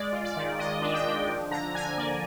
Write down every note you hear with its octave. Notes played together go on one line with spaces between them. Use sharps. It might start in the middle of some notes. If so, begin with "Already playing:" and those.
Already playing: G#3 D5
F4
D5
D#3
G#3 D#5
D4
G5
D4
F3
D3 A#5
D3 G#5
A#3 D5